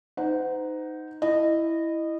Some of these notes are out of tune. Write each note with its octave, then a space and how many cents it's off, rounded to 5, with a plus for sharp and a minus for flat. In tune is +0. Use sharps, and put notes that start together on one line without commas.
D#4 +0 C5 -40 F#5 +0
E4 +0 D#5 -20